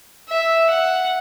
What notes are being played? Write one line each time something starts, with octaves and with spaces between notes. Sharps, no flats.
E5
F#5